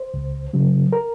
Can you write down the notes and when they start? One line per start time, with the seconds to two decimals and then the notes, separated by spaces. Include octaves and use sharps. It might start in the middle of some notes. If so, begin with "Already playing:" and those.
Already playing: C5
0.14 C#2
0.53 C#3 F#3
0.93 A#4